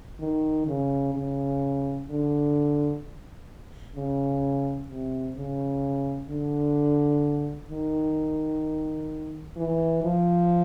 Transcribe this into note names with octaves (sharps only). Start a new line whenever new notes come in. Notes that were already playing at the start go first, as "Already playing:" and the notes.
D#3
C#3
C#3
D3
C#3
C3
C#3
D3
D#3
E3
F3